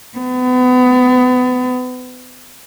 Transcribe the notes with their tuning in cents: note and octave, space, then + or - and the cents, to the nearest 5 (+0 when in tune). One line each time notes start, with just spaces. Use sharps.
B3 +30